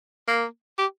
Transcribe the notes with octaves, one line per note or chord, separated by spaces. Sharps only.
A#3
G4